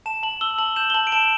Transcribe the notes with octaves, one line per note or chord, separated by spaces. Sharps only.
A5 E7
A5 F#7
E6 G7
A5 F#7
G6 E7
G7
A5 F#7
D7
A5 E7